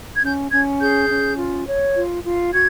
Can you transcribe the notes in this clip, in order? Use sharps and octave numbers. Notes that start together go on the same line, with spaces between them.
G#6
C#4 G6
C#4 G#6
G#4 G6
C#4
F4
C#5
F4
F4
F#4 G#6